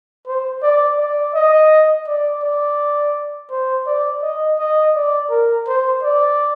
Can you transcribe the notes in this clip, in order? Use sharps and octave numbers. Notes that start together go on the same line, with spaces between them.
C5
D5
D5
D#5
D5
D5
C5
D5
D#5
D#5
D5
A#4
C5
D5